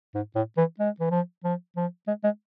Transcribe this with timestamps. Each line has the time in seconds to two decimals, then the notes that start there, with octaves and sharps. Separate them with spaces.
0.14 G#2
0.35 A2
0.57 E3
0.79 G#3
1.00 E3
1.10 F3
1.44 F3
1.76 F3
2.07 G#3
2.24 G#3